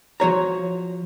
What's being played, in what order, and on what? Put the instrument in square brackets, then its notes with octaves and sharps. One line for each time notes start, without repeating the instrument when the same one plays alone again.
[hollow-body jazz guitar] F3 F#4 C#5 A#5